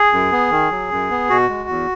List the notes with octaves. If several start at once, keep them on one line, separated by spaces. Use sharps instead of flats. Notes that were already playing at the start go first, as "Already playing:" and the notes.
Already playing: G#4
F#2
B3
D#3
F#3
F#2
B3
B2 F#4
G#3
E2